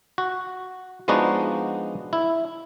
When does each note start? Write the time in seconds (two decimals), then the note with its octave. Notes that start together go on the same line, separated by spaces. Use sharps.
0.18 F#4
1.08 F3 G#3 B3 D4 D#4 F#4
2.13 E4